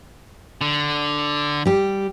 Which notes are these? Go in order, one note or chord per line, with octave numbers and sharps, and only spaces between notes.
D3
G3 G4